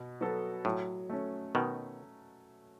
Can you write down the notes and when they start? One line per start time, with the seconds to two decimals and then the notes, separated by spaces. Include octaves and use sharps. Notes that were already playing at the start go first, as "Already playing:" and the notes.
Already playing: B2
0.21 F#3 B3 F#4 A4
0.65 A2 F#3
1.10 A3 C#4
1.55 B2 D#3